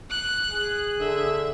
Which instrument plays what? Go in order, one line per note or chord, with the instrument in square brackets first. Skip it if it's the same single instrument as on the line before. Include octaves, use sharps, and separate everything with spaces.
[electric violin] F#6
[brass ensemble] G#4
[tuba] D3 [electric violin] E5